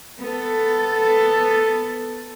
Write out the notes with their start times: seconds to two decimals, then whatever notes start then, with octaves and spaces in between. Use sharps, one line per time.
0.21 B3 A4